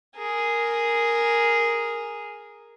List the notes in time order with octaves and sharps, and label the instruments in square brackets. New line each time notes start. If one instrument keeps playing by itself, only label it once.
[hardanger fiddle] G#4 A#4